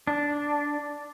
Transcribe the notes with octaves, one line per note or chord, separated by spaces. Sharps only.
D4